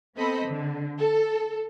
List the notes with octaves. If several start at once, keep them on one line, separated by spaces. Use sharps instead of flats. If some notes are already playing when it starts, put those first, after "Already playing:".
B3 C4 A4 C5 D#5 B5
D3
A4